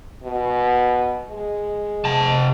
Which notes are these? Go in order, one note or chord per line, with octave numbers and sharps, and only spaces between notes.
B2
G#3
C3 A5